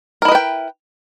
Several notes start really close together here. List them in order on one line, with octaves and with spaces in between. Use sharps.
A#4 E4 D#5 B4 G5